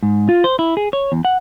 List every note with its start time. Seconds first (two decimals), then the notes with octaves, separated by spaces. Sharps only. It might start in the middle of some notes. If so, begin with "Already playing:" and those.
0.03 G#2
0.29 F4
0.44 C5
0.59 E4
0.77 G#4
0.93 C#5
1.12 E2
1.25 F#5